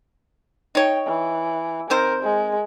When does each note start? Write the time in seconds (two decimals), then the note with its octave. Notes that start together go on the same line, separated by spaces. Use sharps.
0.75 D#4 C#5 G5
1.07 E3
1.90 D#3 C4 A#4 C5
2.23 G#3